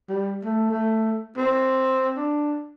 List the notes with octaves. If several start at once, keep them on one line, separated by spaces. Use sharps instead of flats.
G3
A3
A3
C4
D4